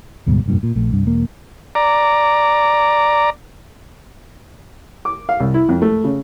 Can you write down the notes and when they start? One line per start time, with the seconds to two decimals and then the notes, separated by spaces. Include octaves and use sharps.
0.27 D2 G#2 B2 G3
0.46 F1 G2 A#2
0.63 A#2
0.76 A#1 A3
0.91 C2 G2
1.05 E1 A#3
1.75 D5 A#5
5.05 D6
5.29 F5
5.40 C2
5.54 E4
5.69 F2
5.82 A3
6.04 C#3